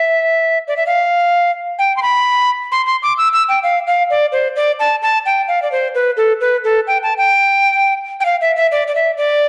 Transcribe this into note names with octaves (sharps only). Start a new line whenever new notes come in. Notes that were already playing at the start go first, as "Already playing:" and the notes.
Already playing: E5
D5
E5
F5
G5
C6
B5
C6
C6
D6
E6
E6
G5
F5
F5
D5
C5
D5
A5
A5
G5
F5
D5
C5
B4
A4
B4
A4
G5
A5
G5
G5
F5
E5
E5
D5
D5
E5
D5